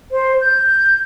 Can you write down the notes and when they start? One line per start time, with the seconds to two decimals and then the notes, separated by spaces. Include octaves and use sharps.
0.11 C5
0.41 G6